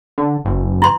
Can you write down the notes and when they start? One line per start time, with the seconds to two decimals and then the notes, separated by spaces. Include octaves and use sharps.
0.18 D3
0.45 F#1
0.82 E4 C6